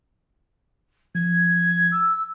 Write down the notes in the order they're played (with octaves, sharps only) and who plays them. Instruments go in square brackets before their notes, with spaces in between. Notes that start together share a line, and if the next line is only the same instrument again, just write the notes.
[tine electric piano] F3 [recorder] G#6
[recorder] E6